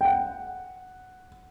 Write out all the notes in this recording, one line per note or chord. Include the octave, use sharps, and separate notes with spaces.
G5
F#5